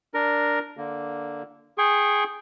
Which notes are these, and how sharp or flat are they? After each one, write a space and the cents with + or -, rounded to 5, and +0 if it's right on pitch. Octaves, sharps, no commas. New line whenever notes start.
D4 +0 A#4 +0
D3 -5 A#3 +0
G#4 +0 G5 +0 C#6 -40